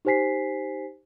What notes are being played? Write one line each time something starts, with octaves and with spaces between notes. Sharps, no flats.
D#4 G4 C5 G#5 B6 C7